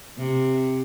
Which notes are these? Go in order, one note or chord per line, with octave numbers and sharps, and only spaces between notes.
C3